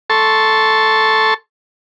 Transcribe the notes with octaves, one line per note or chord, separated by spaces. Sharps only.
A4 A5 C6 C#6